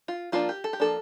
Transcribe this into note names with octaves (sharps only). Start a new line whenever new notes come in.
F4
F3 A#3 D4 F4
G4
A4
G4
F3 A#3 D4 A4